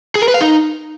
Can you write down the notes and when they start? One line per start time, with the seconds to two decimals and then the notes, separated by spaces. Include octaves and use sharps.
0.15 G#4
0.22 A#4
0.28 B4
0.34 F5
0.40 D#4